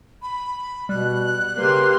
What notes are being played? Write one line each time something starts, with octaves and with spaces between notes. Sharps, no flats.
B5
B2 G3 F#6
C#3 A#3 G4 B4 C6